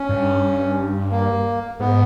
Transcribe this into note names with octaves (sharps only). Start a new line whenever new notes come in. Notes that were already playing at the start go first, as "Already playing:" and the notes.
Already playing: C#4
G2
A#3
G#2 B3